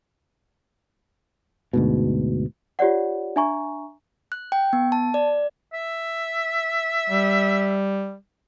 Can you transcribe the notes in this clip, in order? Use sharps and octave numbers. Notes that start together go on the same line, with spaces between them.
D2 G#2 B2
F4 G4 C#5 D5 F#5
D4 E5 G#5 A#5 C#6
F#6
G5
B3
A5
D5
E5
G3